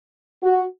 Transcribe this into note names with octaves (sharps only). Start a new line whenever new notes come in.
F#4